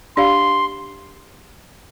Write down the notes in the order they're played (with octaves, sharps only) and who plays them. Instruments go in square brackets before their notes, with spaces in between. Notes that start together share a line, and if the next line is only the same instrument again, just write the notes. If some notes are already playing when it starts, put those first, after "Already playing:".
[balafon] D4 G4 D5 F5 [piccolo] C6